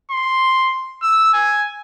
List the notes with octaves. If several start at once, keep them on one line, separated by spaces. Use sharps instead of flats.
C6
E6
G#5